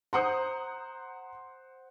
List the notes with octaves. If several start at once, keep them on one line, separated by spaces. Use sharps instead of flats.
C5 F#5 A#5 C6 D#6 G6